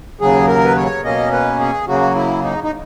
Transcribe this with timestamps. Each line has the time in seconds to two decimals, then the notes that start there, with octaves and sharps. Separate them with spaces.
0.20 D#2 C#3 F#3 G#4
0.48 A#4
0.65 B4
0.76 C#5
1.04 B2 A#3 C#4 D#5
1.32 B4
1.60 G#4
1.87 C#3 F#3 A#3 F#4
2.15 E4
2.44 D#4
2.64 D#4